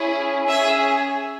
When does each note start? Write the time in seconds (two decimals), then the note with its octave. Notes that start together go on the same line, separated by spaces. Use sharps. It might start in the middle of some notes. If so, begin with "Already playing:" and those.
Already playing: C#4 E4 G#4
0.47 C#4 G#4 E5 E6